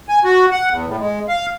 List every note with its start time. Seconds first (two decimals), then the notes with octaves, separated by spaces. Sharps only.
0.09 G#5
0.24 F#4
0.51 F#5
0.71 E2
0.86 A2
1.00 G#3
1.28 F5